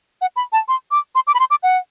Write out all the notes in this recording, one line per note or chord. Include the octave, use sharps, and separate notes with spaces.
F#5
B5
A5
C6
D6
C6
D6
B5
C6
D6
F#5